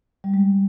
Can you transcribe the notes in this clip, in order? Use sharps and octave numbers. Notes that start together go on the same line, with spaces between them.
G3
G#3